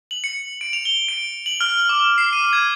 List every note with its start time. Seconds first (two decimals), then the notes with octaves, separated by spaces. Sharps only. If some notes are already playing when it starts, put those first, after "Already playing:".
0.11 F#7
0.24 C#7
0.61 D7
0.73 F7
0.85 G7
1.08 D7
1.46 F#7
1.61 F6
1.89 D6
2.18 C7
2.33 D#7
2.53 G#6